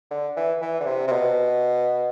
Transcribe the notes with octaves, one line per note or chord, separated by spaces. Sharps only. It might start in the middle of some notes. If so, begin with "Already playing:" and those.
D3
E3
E3
D3
C3
C3
B2